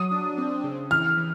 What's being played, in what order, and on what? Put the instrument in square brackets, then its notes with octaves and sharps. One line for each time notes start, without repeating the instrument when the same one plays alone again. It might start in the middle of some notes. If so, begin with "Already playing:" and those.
Already playing: [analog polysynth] F#3 [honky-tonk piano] D#6
[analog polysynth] D4
C4
C#3
[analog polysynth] E3 [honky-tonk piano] F6
[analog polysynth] E3